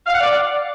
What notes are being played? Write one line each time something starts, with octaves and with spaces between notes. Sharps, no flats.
F5
F#5
D5